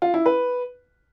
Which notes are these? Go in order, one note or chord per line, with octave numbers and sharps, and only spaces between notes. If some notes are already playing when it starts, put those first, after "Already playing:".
F4
E4
B4